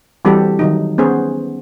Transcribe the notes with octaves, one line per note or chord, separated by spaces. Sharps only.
E3 G3 C4 F#4 G4 A4
D#3 F#3 D#4
B3 C#4 G#4 C5